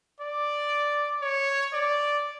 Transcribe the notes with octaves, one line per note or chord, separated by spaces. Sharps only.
D5
C#5
D5